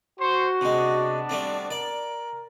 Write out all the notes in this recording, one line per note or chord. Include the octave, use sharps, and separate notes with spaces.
F#4 C5 C6 C#6
C3 G#3 B3 D4
G3 A3 C4
A#4 D5